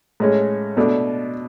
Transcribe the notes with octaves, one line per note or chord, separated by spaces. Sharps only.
A2 G#3 C#4
B2 A3 D4